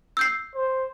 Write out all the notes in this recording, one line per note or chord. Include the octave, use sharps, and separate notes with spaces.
E6 G6 C7
C5